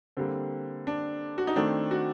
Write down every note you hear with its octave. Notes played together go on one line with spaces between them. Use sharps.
D3 G3 A#3 C4
D4
F#4
D#4
D#3 A3 C4 D4
F#4